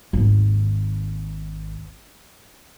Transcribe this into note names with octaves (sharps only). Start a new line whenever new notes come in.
G#1 D#2